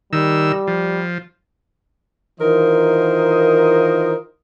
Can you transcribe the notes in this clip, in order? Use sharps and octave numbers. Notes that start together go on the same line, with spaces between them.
D#3 G3 E6
F3
D#3 E3 F4 A#4 C5 D#5